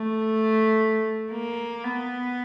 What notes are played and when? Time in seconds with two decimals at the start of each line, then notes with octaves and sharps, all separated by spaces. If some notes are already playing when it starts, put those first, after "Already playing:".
Already playing: A3
1.32 A#3
1.84 B3